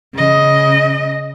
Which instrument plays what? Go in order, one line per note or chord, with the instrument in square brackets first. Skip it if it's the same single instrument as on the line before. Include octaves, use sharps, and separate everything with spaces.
[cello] C#3 D#5